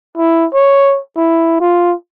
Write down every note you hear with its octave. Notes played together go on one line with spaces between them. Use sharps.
E4
C#5
E4
F4